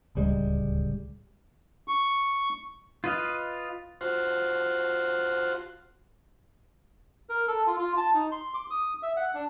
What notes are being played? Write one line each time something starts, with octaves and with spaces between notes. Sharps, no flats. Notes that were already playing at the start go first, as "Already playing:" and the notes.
D1 C#2 G3 G#3
C#6
F4 B4 D#5 F5
F4 F#4 C5
A#4
A4
F4
F4
A5
D#4
C6
D6
D#6
E5
F#5
D4